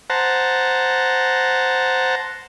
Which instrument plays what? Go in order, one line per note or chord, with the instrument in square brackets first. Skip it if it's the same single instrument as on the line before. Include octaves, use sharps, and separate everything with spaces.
[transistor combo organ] C5 F#5 A5 A#5